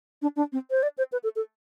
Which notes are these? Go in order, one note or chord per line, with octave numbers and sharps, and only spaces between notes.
D4
D4
C4
C5
D5
C5
B4
A4
A4